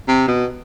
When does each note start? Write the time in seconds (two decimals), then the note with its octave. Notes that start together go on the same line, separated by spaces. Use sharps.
0.08 C3
0.28 B2